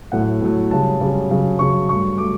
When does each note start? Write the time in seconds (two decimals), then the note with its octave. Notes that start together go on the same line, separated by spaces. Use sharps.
0.12 A2 F#3 A3 F#5
0.41 A2 F#3 A3
0.71 F#2 C#3 G3 A5
1.01 F#2 C#3 G3
1.30 F#2 C#3 F#3
1.59 F#2 C#3 F#3 C#6
1.89 G2 F#3 A3 C#6
2.18 F#3 A3 D6